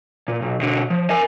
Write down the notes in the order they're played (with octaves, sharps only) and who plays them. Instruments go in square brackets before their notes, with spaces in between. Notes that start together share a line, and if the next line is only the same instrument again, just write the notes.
[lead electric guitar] A#2
B1
B2 D3
F3
A#4 G#5